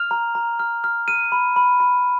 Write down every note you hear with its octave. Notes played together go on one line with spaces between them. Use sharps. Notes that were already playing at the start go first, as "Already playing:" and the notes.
Already playing: F6 F7
A#5
A#5
F6
F6
F6 D#7
B5
B5
B5